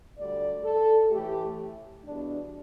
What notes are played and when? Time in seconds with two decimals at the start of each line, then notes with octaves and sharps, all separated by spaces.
0.17 D2 D3 G3 D5
0.64 A4
1.11 A2 E3 A3 G4
2.05 E2 B2 G3 D4